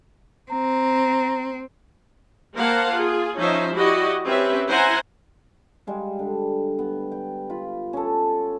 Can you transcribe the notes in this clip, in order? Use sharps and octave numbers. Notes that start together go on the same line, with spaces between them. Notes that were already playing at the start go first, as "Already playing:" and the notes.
C4 A#5
A#3 A#4 C5 F5 F#5 A5
F4 G#4
F3 C#4 D#4 C5 E5
E4 F#4 G4 D5 D#5
C4 C#4 G4 B4 E5
E4 C5 F#5 G#5 A#5
G3 G#3 F5
D3
B3
G5
F4 B5
C#4 A4